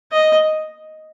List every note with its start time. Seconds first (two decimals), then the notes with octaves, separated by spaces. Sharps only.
0.13 D#5